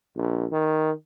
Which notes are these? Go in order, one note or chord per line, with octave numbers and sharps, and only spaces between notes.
A#1
D#3